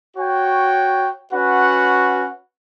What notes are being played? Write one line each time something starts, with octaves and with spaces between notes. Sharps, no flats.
F#4 C#5 G5
C#4 F#4 B4 F#5